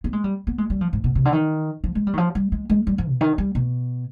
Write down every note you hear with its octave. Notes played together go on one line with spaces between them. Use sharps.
B3
G#3
G3
B3
G#3
G3
F3
G#2
B2
C3
D3
D#3
F3
G#3
G3
D#3
F3
G3
G#3
G#3
G3
F3
B2
D#3
G3
B2